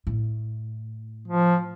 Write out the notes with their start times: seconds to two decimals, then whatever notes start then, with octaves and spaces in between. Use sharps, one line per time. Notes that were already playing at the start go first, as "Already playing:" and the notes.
0.07 A2
1.28 F3